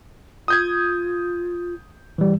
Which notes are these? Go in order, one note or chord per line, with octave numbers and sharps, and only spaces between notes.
F4 D#6 G6 G#6
E3 G3